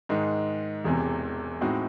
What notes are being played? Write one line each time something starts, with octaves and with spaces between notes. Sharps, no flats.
G#2 D#3 G#3 D#4
E1 E2 C3
A2 G#3 C4 D#4 F#4